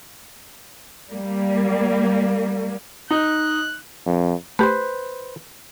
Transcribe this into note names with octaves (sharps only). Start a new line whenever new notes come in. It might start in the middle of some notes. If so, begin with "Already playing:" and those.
G3 A#3
D#4 F#6
F2
A3 G4 B4 C5